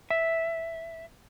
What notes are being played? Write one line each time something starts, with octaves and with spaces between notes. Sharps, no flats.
E5